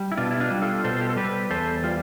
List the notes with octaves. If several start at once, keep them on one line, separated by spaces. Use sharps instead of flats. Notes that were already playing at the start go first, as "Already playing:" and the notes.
Already playing: G3
E4
B2 D4 F4
E4
D4 F4
G3
F4 A4
B2 A4 C5
G4
A4
G3 G4 B4
E2 A4 C5
G3 F4